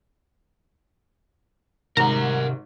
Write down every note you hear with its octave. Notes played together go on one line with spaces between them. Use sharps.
G#1 G#2 C3 A#4 F#5 A#5